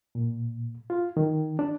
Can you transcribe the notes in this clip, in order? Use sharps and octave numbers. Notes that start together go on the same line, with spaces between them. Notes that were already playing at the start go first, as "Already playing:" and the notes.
A#2
F4
D#3
D4